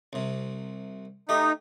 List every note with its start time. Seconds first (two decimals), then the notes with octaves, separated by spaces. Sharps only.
0.13 C2 C3
1.29 A3 D#4 G4